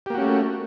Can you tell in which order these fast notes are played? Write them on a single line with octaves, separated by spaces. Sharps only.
G4 A#3 F#4 C#4 A3